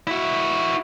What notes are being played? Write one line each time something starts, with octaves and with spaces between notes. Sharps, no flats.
E4 F#4